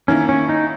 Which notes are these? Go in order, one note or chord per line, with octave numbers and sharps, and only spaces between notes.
D#3 A#3 C#4 E4
C#4
D#4